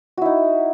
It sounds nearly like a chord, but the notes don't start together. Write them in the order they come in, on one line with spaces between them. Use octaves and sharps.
F#4 E4 D#4